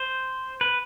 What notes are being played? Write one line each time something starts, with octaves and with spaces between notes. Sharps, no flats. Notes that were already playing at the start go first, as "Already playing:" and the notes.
Already playing: C5
B4